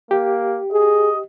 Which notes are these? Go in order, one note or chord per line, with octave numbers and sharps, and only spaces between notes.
A#3 G4
G#4 D#5